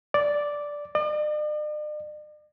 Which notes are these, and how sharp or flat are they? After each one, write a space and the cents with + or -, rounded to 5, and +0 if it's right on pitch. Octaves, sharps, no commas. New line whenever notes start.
D5 -5
D5 +45